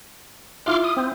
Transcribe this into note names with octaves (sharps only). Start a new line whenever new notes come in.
E4 F4 E5 C6 D6 F6
D#6
C4